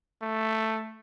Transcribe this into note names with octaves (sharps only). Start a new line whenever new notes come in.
A3